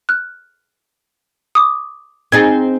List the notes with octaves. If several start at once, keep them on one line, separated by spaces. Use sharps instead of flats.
F6 F#6
D6 D#6
C4 D#4 G#4 G#6 A6